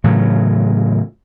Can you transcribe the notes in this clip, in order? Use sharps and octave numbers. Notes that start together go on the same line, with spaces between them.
A2 C#3 E3 F#3